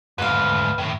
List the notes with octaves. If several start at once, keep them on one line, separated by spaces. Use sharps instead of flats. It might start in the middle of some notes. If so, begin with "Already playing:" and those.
D2 G#2 B4 F5
A2 D#3